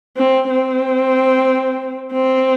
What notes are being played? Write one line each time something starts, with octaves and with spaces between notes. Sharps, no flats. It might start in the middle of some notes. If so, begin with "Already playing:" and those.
C4
C4
C4